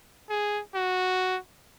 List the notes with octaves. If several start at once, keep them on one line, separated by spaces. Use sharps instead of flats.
G#4
F#4